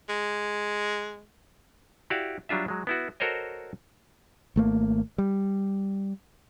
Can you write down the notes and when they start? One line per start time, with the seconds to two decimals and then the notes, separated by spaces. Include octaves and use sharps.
0.09 G#3
2.10 E4 F#4 G4 D5 F5
2.49 F#3 G3 D4 F4 E5
2.68 F#3 G#3
2.87 B3 E4 F#4
3.20 F#4 A4 A#4 C5 C#5 D#5
4.56 G#1 A3 A#3
5.18 G3